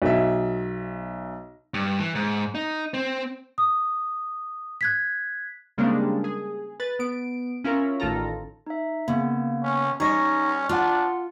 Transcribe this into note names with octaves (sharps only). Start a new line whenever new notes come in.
B1 E5
G2
E3
G#2
D#4
C4
D#6
F#6 G#6 B6
C#3 G3 G#3 A#3 C4 D4
G#4
B4 A6
B3 D7
C#4 E4 F4 A#4
A1 D#3 F4 A4 A#5
D#4 E5
C#3 A#3 B3
C#4
G3 C#4 D#4 D#5 C#6 A#6
D4 F4 F#5 C6 F6